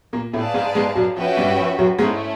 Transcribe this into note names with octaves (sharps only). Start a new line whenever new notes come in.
A#2 A#3
A2 A3 G#4 B4 D5 F5 A5
G#2 G#3
G#2 G#3
F#2 F#3
F3 C#4 F#4 B4 E5 G5
G2 G3
F3
F#2 F#3
G#2 G#3 A3 C#4 E4